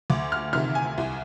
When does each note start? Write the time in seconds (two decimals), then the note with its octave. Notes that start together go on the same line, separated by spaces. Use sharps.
0.10 D2 D6
0.32 F6
0.53 C3 D#3 F6
0.75 G#5
0.98 C2